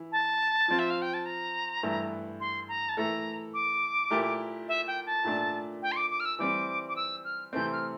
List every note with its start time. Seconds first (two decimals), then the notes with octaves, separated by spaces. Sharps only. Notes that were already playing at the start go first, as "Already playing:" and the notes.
Already playing: E3 E4
0.12 A5
0.68 F3 C4 F4
0.79 E5
0.90 F5
1.02 G5
1.14 A5
1.26 A#5
1.83 G2 E3 A3 E4
2.40 C6
2.68 A#5
2.89 A5
2.97 E3 A3 E4 A4 A#5
3.54 D6
4.11 A#2 A3 E4 G4 A#4
4.68 E5
4.87 G5
5.06 A5
5.24 A#2 A3 D4
5.82 G5
5.92 C6
5.96 D6
6.11 D6
6.20 F6
6.25 E6
6.39 E3 G3 C4 D6
6.88 D6
6.96 E6
7.24 F6
7.53 C3 E3 A3 C4 G6
7.72 F6